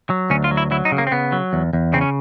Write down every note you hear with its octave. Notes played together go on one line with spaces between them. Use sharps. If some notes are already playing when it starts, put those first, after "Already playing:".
F#3
D2 C#4
F4
F#3
E4
F#3 E4
D#4
C#3
A#3
C4
C#3 B3
F#3
E2
E2
C#3 C4
C#4